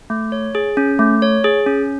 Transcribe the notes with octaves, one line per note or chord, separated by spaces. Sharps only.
A3
C#5
G#4
C#4
A3
C#5
G#4
C#4